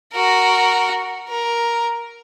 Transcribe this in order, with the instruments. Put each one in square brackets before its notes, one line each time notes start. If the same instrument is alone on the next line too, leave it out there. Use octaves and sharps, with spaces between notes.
[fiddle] F#4 A#4
A#4